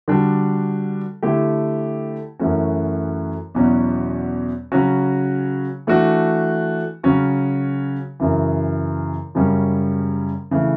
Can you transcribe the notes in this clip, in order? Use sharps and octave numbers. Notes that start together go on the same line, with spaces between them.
D3 G3 D4 F#4
D3 A3 E4 G4
F#2 E3 A3 C#4 F#4
E2 B2 F#3 C#4 E4
C#3 F#3 C#4 F#4
E3 A3 D4 F#4
C#3 F#3 C#4 F#4
F#2 C#3 E3
F#2 C#3 G3 C#4
C#3 E3 A3